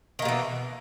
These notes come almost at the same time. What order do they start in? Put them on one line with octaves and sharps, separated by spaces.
D#3 A#3 B2 E3